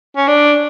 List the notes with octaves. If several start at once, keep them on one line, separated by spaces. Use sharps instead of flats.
C#4
D4